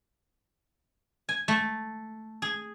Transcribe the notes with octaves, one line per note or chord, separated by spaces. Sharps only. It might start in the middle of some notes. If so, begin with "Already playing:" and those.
G#5
A3
G#4